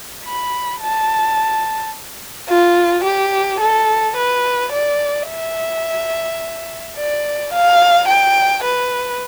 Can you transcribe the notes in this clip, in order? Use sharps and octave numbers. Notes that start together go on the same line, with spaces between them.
B5
A5
F4
G4
A4
B4
D5
E5
D5
F5
G5
B4